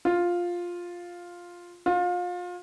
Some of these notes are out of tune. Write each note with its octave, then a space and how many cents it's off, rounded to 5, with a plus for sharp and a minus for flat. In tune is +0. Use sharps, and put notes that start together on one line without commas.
F4 +5
F4 +30